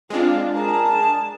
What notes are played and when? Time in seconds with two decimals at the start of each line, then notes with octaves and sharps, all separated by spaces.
0.10 G#3 C4 D4 F4
0.54 G#4 A#4 A5